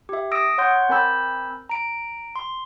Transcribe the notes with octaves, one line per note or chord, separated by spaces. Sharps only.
G4 E5
D#6 E6 A#6 D7
C#5 F#5 C6 G6
C4 A#4 G#5 B5 E6 G6
A#5 D7
C6